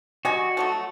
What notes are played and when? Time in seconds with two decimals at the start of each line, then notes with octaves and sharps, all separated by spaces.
0.25 G3 F#4 D#5 G#5
0.57 F3 F#3 A3